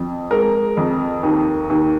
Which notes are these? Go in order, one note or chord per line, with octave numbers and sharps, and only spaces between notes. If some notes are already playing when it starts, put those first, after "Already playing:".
Already playing: F2
G#3 A#4
F2
D#2
D#2